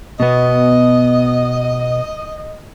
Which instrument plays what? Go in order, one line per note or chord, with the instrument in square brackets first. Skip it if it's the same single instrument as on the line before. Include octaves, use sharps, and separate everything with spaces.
[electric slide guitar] B2 B3 [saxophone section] D#5